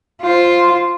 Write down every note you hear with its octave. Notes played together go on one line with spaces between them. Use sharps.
F4 C5